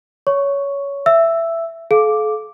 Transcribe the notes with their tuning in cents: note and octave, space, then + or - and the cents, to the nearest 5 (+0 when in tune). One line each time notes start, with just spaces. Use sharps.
C#5 +15 C#6 +0
E5 +15 E6 +0
A4 -40 F5 +5 D6 +0